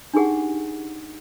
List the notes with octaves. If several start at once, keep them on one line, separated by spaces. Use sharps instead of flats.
D4 D#4 G4 G#4 F#5